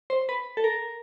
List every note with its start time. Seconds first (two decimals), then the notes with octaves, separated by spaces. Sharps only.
0.10 C5
0.29 B4
0.57 A4
0.64 A#4